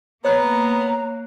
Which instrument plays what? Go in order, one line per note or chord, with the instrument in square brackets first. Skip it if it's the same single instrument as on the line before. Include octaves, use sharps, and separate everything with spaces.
[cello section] A#3 [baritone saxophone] B3 [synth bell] C#5 F#6 [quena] A#5